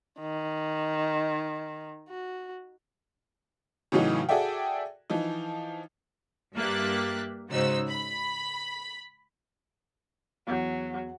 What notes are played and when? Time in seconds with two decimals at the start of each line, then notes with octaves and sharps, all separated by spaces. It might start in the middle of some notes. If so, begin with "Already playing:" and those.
0.20 D#3
2.09 F#4
3.92 A2 C#3 E3 F#3 D#4
4.29 F#4 G#4 A4 D5 E5 G5
5.10 E3 F3 D#4
6.55 G2 A#3 G4 E5 F#6 A6
7.50 G#2 C#3 D#4 F#4 C5 E6
7.88 B5
10.48 E2 F#3